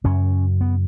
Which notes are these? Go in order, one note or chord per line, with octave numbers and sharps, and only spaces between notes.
F#2 C#3 C#4
B3